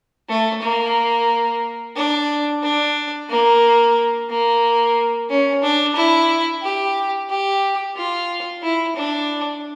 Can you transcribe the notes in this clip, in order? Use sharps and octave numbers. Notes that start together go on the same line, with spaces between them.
A3
A#3
D4
D4
A#3
A#3
C#4
D4
E4
G4
G4
F4
E4
D4